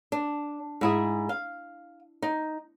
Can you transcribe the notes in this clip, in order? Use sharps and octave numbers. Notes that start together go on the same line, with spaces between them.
D4
G#2 E4 G#4
F5
D#4